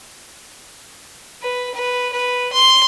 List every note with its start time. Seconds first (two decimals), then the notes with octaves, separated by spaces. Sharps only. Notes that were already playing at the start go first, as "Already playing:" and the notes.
1.42 B4
1.74 B4
2.12 B4
2.52 C6